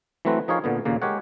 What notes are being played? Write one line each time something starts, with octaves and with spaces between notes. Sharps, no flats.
E3 F#3 A3 C4 B4 A#5
F3 D#4 G#4 A#4 C#5 F5
A#2 D3 B3
D#2 A#2 C#3 A#3
G#3 G4 A#4 C#5 F#5